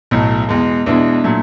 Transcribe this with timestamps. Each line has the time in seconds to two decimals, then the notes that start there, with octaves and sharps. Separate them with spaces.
0.11 B1 A2 F#3 A3
0.49 E2 B2 G#3
0.86 E2 B2 G#3 D4 E4
1.24 A#2 F#3 A3